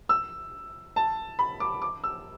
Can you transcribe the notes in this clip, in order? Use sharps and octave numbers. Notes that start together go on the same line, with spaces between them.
E6
A5
B5
D6
D6
E6